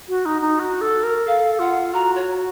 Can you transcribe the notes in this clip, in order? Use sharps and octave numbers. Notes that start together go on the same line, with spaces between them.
F#4
D#4
D#4
F#4
A4
A#4
A4 F5
F4 F#5
F#4 A#5
C#5